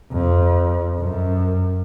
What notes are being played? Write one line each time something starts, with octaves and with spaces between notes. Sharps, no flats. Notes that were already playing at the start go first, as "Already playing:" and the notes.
F2
F#2